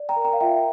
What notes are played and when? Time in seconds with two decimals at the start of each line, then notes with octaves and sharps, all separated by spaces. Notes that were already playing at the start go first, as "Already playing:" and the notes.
Already playing: D5
0.09 G5 A#5
0.16 A#4
0.25 G5 A#5
0.33 F5
0.41 F4 E5 G5